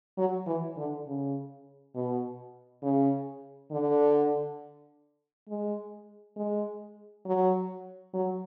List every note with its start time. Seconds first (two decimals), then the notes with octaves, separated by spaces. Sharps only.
0.18 F#3
0.46 E3
0.77 D3
1.06 C#3
1.95 B2
2.82 C#3
3.71 D3
5.48 G#3
6.36 G#3
7.25 F#3
8.14 F#3